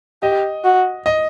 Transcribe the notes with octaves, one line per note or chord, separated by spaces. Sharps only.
G4 D#5
F#4
D#5